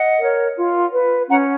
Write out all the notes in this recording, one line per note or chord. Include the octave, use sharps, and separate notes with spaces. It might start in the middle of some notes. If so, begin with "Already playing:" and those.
Already playing: D#5 F#5
A#4 C#5
F4
B4
C#4 F#5 A#5